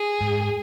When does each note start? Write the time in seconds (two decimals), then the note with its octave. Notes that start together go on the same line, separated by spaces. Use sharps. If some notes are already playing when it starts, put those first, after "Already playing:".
Already playing: G#4
0.21 G#2